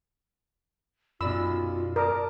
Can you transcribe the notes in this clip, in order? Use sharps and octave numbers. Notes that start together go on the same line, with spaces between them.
B1 F#2 F4 D5 B5 E6
A#4 D5 A5 D6 D#6